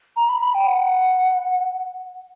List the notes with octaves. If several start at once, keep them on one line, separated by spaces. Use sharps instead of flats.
A#5
B5
B5
G5
F#5